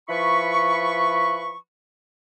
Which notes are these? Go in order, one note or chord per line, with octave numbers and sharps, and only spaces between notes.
F3 E4 B4 B5 C#6